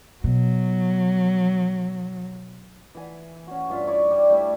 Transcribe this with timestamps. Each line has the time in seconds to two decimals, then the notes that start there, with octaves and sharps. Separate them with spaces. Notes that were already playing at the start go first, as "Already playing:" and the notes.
0.24 B2 F#3
2.95 E3 G#5
3.47 C#4 F#4
3.69 G2 F4 E5
3.87 E4 C#5 D5
4.11 G3
4.30 G3 A3 E4